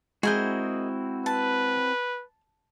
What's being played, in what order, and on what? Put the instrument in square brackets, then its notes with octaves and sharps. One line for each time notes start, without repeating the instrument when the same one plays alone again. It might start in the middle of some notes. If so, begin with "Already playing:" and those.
[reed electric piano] G#3 G6 [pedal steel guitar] C4 E4 F#4 [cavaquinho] G#4 A#4 D#5
[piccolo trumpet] B4 [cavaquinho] A5